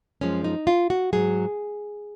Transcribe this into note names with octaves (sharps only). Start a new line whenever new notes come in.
F#2 F3 G#3 C#4
D#4
F4
F#4
G#2 F#3 G#4